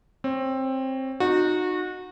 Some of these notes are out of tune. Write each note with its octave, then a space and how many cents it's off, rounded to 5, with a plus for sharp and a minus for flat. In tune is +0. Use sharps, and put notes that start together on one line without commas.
C4 +15 C#5 +0
D#4 -15 F#4 -20